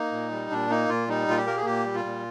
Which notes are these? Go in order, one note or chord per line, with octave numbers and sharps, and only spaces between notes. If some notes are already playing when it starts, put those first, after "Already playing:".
Already playing: A#3 D#4
A#2
G3
A#2 D4
A#3 D#4
A#2 F4
G3 D#4
A#2 F4
G4
A#3 A#4
G#4
A#2 G4
G3
F4
A#2